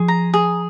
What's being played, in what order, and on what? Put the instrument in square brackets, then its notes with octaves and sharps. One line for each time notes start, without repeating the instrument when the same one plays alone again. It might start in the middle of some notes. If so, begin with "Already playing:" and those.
Already playing: [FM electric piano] F3 [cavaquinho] G#4
[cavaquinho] A#5
G#4